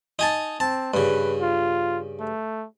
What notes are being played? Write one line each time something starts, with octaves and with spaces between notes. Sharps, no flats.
D#4 G#5 A5
C4 A5
G2 C#3 B4
F4
A3